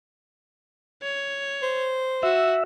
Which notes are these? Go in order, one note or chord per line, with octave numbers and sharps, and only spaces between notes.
C#5
C5
F#4 E5